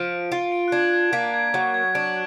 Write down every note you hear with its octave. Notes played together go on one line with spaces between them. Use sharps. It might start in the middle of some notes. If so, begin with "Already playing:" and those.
Already playing: F3 D7
F4
D7
F#6
D4 G#6
G#6
A#3 B6
G#6
F#3
G#6
D4 D7